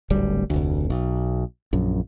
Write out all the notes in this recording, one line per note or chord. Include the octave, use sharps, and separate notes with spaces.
D1 G#1 D2 G3
F1 D2
B1
A#1 F#2